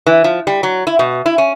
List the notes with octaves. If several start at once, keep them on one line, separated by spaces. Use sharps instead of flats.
E3
F3
G3
F#3
E4
B2
E4
C#4